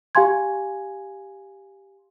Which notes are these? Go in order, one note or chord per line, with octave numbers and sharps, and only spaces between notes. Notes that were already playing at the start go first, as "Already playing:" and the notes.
G4 F5 G#5 C6 G#6